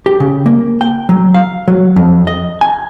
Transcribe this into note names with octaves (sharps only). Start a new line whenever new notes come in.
G4
C#3
A#3
G5
F#3
F5
F#3
F2
D#5
G#5